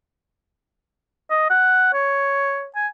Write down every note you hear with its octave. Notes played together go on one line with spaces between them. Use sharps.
D#5
F#5
C#5
G#5